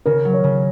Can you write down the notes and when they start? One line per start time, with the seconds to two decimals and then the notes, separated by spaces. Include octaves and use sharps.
0.06 C#3 A#4
0.25 F#3
0.33 C#5
0.44 C#3